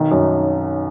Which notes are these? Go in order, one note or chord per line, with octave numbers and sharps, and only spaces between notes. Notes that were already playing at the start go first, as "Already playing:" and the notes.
Already playing: B1 D#3
F#2